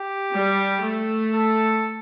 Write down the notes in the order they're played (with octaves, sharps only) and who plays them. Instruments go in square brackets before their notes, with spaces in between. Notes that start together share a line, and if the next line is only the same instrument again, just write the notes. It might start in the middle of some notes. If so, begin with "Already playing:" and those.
Already playing: [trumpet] G4
[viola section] G3
A3
[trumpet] A4